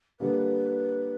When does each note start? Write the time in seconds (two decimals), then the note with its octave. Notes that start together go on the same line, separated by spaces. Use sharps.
0.20 D3 G3 A#3 B4